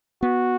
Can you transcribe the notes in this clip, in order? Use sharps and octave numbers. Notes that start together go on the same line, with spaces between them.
B3 F#4